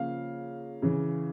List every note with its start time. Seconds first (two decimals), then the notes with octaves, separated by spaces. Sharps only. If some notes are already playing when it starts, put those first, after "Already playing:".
Already playing: C#3 F3 A#3 F5
0.82 C#3 E3